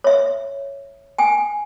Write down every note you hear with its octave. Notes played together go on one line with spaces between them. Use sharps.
C#5 E5
G5 G#5